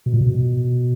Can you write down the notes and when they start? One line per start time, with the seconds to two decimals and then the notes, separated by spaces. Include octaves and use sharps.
0.06 B2
0.14 A#2
0.21 B2